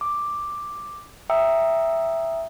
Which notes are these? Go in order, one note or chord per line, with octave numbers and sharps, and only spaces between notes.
D6
E5 G5 A#5 D#6 E6 C#7